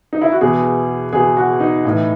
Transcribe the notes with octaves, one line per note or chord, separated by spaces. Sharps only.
D#4
E4
F#4
E2 B2 G#4
E2 B2 G#4
F#4
D#4
A2 E3